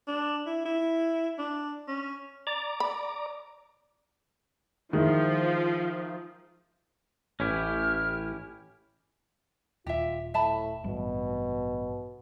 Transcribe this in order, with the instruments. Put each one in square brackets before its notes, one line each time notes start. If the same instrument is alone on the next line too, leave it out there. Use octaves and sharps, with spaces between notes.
[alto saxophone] D4
E4
E4
D4
C#4
[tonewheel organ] D5 A#5 D6
[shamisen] B5
[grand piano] D#3 G#3 E4 [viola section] F3
[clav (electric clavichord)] A1 [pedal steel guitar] C#4 E4 G4 [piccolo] F6
[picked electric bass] D#1 [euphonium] F4 [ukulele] G4 E5
[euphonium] A2 [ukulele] E5 A5 B5
[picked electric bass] A1 G2 G3 [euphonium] B2